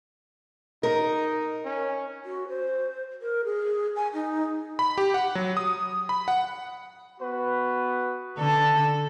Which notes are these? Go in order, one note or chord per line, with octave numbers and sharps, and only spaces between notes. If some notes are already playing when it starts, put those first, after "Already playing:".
D#4 A#4
C#4
F#4
C5
A#4
G#4
G#5
D#4
B5
G4
F#5
F#3
D#6
B5
F#5
B3 F#4 B4
D3 A4 D5 A5